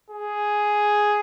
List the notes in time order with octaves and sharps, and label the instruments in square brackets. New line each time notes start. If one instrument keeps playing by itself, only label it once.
[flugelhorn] G#4